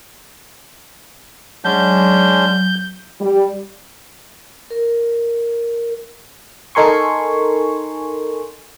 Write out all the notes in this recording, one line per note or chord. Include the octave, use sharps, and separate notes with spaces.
F#3 G#3 C#4 D4 G6
G3
A#4
D#4 A4 A#4 G#5 C6 C#6